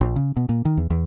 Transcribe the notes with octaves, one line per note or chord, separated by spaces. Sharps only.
A#1
C#3
B2
A#2
D#3
E2
E2